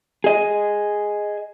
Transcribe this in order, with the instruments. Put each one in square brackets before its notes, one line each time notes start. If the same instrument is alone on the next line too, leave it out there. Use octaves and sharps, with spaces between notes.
[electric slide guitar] G#4 D#5